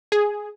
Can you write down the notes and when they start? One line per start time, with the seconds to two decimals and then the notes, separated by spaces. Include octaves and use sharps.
0.12 G#4